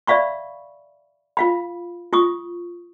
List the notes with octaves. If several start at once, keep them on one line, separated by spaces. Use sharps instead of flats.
D5 E5 F5 B5 C#6
F4 F5 B5
F4 C#6 D#6